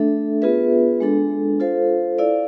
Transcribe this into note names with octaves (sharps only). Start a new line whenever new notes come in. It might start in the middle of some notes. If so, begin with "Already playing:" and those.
Already playing: A3 D4 A4 E5
B3 F4 G#4 B4 E5
G#3 D4 A4
F4 A4 C5 F5
E4 A4 D5 F5